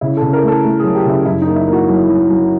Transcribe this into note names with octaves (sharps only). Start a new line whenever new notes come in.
C#3 E4
A4
C#3
A#4
A3 A4
A3
F#3 G#4
G4
C#3 E4
F#2 E4
D#4
A#3
E4
A#3
F#4
F#3
F#3
F#3